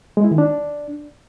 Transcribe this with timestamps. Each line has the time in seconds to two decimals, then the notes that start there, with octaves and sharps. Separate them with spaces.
0.17 G#3
0.24 E4
0.31 D#3
0.38 D4